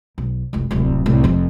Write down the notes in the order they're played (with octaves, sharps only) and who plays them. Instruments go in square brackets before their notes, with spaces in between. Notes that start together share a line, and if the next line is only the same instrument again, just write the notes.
[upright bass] B1
F1 C2
D1 C2
C2 A2
F1 F2